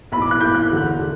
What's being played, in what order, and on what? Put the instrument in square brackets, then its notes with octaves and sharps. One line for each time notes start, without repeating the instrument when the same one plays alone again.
[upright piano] B1 A2 E3 B5
D6
F#6
B1 A2 E3 G6
F#6
E1 E2 D3
D3